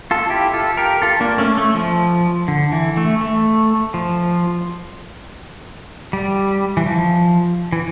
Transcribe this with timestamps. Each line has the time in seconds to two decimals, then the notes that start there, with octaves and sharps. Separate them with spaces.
0.11 F4 A4
0.30 E4 G4
0.53 F4 A4
0.77 G4 A#4
1.02 F4 A4
1.20 A#3 D4
1.38 A3 C#4
1.57 A3
1.75 F3
2.48 D3
2.72 E3
2.97 A3
3.21 A3
3.94 F3
6.13 G3
6.77 E3
6.86 F3
7.72 E3